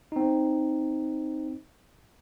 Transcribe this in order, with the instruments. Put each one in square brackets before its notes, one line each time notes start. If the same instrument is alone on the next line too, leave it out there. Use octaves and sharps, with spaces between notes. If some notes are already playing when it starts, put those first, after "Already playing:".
[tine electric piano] C4 D#4